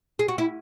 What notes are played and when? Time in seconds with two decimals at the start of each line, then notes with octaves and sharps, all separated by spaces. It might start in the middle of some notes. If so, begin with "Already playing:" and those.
0.19 G#4
0.28 F#4
0.38 E4